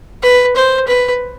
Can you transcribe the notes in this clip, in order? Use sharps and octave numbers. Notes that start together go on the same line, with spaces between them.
B4
C5
B4